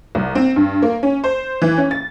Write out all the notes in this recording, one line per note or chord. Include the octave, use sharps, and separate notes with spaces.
C2
C4
G2
A#3
C#4
C5
E3
C#4
A6